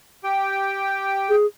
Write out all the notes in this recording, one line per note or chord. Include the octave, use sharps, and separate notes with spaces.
G4 G5
G#4